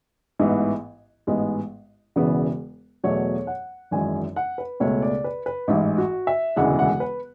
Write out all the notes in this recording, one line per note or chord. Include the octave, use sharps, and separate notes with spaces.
A1 G#2 E3 B3
A1 G#2 G#3 B3
E1 E2 C#3 E3 B3
E2 B2 F#3 A3 C#5
F#5
G#1 F#2 E3 G#3 G#5
F#5
B4
C#2 B2 A3 C#5
D5
B4
B4
A1 G#2 E3 E4
F#4
E5
E1 D2 C#3 E3 G#3 F#5
F#5
B4